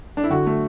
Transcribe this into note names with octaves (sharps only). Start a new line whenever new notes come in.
D4
E4
D3 F#4
A3